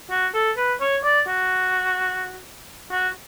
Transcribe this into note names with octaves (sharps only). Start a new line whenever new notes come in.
F#4
A4
B4
C#5
D5
F#4
F#4